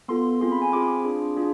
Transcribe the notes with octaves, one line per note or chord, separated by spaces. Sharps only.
B3 F4 A4 C6
C4 F4 G#4 C6
B5
G#5
C4 F4 G#4 D6
D4 F4 G#4
D4 F4 G#4